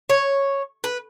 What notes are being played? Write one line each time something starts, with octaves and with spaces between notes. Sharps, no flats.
C#5
B4